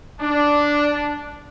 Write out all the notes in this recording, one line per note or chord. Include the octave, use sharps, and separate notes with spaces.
D4